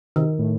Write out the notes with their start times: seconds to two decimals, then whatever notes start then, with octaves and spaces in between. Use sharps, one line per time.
0.16 C3 D#3
0.39 A2